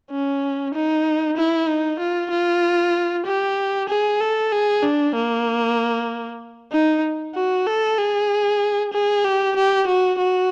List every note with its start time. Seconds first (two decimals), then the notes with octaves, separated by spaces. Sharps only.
0.11 C#4
0.74 D#4
1.37 E4
1.68 D#4
1.99 F4
2.31 F4
3.26 G4
3.89 G#4
4.21 A4
4.52 G#4
4.83 D4
5.15 A#3
6.72 D#4
7.35 F#4
7.67 A4
7.98 G#4
8.93 G#4
9.25 G4
9.56 G4
9.87 F#4
10.18 F#4